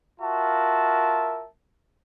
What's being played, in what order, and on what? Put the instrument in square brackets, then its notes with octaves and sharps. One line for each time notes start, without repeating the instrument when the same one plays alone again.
[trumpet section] F4 F#4 A#4 E5 A5